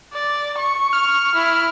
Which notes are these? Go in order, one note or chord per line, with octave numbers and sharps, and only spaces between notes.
D5
C#6
F6
E4